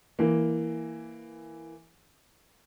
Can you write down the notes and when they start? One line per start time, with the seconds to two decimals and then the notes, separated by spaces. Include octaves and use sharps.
0.19 E3 A#3